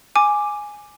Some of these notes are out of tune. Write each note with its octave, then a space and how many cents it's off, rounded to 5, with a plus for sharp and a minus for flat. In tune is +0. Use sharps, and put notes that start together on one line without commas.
G#5 +0 D6 +5